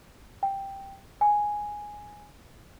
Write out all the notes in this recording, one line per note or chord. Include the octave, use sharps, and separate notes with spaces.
G5
G#5